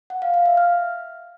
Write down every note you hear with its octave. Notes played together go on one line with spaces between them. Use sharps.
F#5
F5
F5
E5
F6